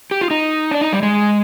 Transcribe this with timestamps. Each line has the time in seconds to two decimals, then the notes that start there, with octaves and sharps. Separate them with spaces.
0.11 G4
0.21 F4
0.31 D#4
0.71 D4
0.81 D#4
0.93 G3
1.03 G#3